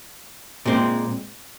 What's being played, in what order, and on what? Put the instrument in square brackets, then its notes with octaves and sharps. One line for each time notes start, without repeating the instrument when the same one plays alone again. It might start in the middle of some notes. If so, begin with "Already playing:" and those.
[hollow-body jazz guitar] A#2 G#3 C4